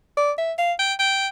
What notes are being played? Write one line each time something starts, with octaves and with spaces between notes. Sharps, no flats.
D5
E5
F5
G5
G5